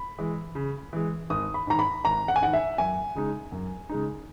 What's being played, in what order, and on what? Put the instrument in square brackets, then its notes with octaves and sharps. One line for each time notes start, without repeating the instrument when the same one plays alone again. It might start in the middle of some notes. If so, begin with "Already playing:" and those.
Already playing: [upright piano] B5
[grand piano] E3 G#3
C#3
E3 G#3
[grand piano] G#1 [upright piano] D#6
[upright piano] B5
[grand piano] G#2 D#3 [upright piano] A#5
[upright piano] B5
[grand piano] G#1 [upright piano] A#5
[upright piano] F#5
G#5
[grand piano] G#2 D#3 [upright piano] F#5
[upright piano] E5
[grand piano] F#2 [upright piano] G#5
[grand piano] C#3 G#3 D#4
F#2
C#3 G#3 D#4